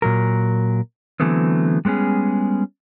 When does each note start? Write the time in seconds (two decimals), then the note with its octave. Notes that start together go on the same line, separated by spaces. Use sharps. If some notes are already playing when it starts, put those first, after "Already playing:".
0.02 A#2 F#3 A#4
1.20 D3 E3 F#3 A3 B3 C4
1.85 G3 G#3 B3 C#4 G#4